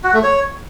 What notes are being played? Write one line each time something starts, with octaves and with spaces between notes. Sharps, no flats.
F#4
A3
C#5